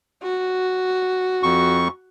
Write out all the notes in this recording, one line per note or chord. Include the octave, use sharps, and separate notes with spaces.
F#4
F2 C#6